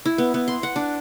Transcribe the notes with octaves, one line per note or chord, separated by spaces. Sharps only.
E4
B3
B3
C6
F#5
D4